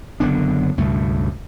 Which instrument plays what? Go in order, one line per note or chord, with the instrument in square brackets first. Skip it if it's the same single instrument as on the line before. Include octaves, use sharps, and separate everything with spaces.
[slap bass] F#1 D3 B3 D4
C#2 G2 B2 A3